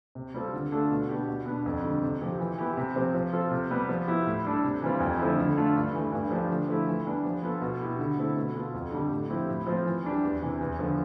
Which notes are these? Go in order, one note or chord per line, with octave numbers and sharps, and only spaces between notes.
C3
G3 C4 F4 A4
D3
A3 D4 F4 A4
B2
B3 D4 G4
B2
B3 D4
F2
D3 G3
C3
F3 C4 G4
E3
B3 E4 G4
C3
F3 C4 G4
F3
C4 F4 A4
C3
G3 B3
F3
B3 E4 G4
A2
G3 D4 A4
C3
E3 G3 C4 F4
F2
D3 F3 A3 E4
D3
A3 D4 F4 A4
G2
E3 A3
G2
F3 A3 D4 G4
D3
F3 A3 E4
E3
G3 B3 D4
F3
B3 F4 A4
B2
B3 E4 G4
D3
A3 C4 E4 A4
B2
B3 F4 A4
F2
D3 G3 D4 G4
A2
F3 C4 E4 G4
A2
F3 C4 F4
E3
G3 D4 G4
E2
C3 E3
E2
D3 F3